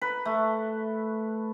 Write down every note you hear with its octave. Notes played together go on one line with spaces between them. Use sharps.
B4
A3